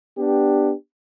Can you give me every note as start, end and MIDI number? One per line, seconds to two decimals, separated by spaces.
0.18 0.74 59
0.18 0.74 62
0.18 0.74 67